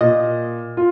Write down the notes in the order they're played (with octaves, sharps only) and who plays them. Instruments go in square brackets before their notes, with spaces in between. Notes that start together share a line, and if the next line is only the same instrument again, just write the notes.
[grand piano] A#2 [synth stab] D#5
[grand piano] F4